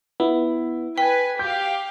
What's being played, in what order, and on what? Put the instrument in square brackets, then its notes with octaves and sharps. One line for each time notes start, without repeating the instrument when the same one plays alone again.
[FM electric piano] B3 [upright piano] E4
[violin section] B4 G#5 [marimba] G5 [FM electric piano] B6
[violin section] G4 F5 [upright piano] G6